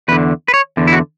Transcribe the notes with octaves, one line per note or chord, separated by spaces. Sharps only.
E2 D3 B4
B4
C#5
E2 D3
E4
F#4